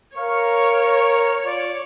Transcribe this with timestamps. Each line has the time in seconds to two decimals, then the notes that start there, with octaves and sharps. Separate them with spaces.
0.16 A#4 C#5 F5 C#6
1.44 F4 D5